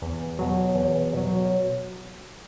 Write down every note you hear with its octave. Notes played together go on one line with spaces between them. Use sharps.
E2
B2 F#3
E2
B2 F#3